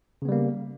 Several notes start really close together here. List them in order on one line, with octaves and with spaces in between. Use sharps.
C#3 B3 G3 A#3